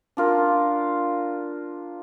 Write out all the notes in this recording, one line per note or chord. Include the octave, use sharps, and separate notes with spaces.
D4 F4 A#4